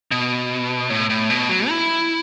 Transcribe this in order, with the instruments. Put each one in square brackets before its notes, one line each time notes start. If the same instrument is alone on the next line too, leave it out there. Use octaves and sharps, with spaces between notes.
[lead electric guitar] B2
A2
A2
B2
F#3
E4